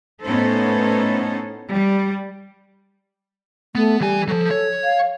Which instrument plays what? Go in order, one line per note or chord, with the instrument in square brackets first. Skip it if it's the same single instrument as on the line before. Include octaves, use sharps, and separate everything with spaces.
[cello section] A2 B3 C#4 D#4 A4 C5
G3
[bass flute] A3 [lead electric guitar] B3
[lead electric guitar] E3 G#5 [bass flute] G3
[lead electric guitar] F3 F#3 [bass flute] A4
[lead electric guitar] C#5
[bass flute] F5